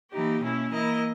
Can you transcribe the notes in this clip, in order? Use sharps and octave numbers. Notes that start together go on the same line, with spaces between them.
E3 A#3 D#4 G4
B2 A#3 C#4 E4
E3 A#3 E4 A#4 D#5